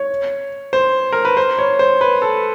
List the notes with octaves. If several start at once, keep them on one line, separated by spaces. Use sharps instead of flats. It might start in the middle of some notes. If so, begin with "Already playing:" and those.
Already playing: C#5
C5
A#4
B4
C5
C#5
C5
B4
A4